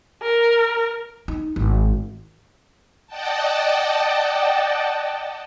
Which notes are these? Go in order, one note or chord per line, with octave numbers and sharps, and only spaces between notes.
A#4
D#4
G#1
D5 D#5 F#5 G5 A5